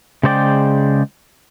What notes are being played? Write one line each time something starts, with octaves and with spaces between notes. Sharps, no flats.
C#3 G#3 C5 D5 G5